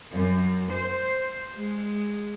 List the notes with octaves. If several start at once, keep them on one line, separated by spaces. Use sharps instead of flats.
F#2
C5
G#3